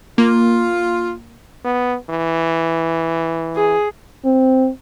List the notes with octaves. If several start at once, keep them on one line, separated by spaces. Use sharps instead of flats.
A#3 F4
B3
E3
G#4
C4